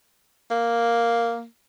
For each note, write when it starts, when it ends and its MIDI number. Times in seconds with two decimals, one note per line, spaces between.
0.51 1.45 58